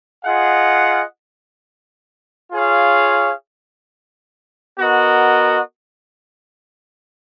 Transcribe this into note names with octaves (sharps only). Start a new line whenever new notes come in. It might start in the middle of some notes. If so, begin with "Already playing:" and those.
F4 G#4 D#5 F#5
F4 G#4 C#5 F5
B3 F#4 A#4 D#5